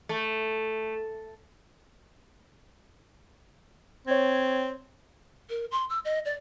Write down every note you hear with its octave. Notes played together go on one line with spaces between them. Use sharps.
A3
C4 C#5 G#6
A#4
C6
E6
D#5
D5